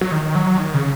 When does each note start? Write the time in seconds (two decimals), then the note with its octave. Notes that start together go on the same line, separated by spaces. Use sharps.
0.01 F#3
0.12 D#3
0.35 F#3
0.58 D#3
0.74 C#3